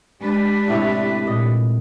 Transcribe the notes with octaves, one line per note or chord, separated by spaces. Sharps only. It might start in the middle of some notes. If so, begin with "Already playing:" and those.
G#3 D4 G4 B4
A2 C3 C#5
A#2 D#5